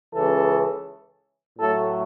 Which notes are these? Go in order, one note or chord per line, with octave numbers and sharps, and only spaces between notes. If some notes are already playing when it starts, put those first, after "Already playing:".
C#2 C#3 E3 A4
A2 F#3 A3 A4